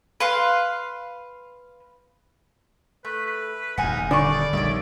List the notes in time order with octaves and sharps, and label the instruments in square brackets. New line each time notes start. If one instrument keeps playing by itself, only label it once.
[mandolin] B4 F5 C6
[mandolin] A3 [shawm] B4
[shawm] B4
[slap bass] D#1 E2 [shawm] D#4 [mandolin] F#5 G#5 F#6
[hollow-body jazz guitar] D3 [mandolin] D#4 B5 C#6 [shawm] D5
[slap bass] A#1 D#3 G3 [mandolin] C#5 D#5 E5